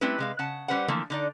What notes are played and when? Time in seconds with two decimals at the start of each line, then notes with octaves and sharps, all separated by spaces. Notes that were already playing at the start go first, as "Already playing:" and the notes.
0.01 G3 A3 C4 C#4 E4 B4
0.19 C3 G#3 F5
0.39 C#3 F#5 A5
0.68 G3 C#4 B4 C5 F#5
0.88 D3 E3 F3 A3 A#3
1.10 D3 D#4 D5